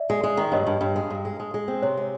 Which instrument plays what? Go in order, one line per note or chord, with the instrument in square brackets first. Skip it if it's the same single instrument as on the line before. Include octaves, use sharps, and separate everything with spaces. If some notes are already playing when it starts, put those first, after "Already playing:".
Already playing: [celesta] D5 E5
[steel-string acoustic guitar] G#3
G#3
D#3
[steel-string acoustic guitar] G2 [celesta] C#5 D#5
[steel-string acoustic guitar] G2
G2
G#3
G2
G#3
G#3
G#3
C4
[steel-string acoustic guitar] C3 [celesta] C#5
[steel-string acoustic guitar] G#3